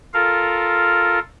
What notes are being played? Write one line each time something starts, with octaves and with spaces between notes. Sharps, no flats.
F4 A4 A#4 F5